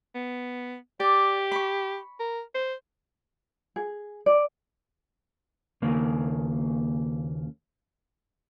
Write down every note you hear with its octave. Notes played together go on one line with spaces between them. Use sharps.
B3
G4 D5
B5 C#6
A#4
C5
G#4
D5
D#2 C#3 A#3